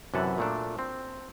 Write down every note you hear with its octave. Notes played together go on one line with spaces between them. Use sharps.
F#2 C3 E3 B4 F#5 A5
A#2 A3 D4
C4